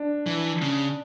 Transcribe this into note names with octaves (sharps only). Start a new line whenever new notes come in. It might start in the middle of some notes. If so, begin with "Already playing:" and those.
Already playing: D4
E3
C#3